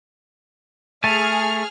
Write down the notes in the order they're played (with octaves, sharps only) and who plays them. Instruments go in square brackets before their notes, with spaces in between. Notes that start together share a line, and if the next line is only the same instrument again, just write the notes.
[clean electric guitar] A3 [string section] G#4 F6 [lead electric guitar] G#5 A5